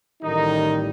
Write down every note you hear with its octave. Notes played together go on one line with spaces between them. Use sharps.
A1 A2 D#3 G3 D#4